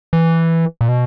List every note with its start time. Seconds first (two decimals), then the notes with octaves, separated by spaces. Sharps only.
0.13 E3
0.81 A#2
0.88 B2